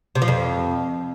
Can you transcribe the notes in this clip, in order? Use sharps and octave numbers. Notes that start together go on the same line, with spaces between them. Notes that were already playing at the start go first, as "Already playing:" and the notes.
C3
F3
F2